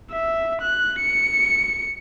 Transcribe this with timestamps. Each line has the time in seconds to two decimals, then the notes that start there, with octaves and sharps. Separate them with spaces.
0.12 E5
0.62 F#6
1.01 C#7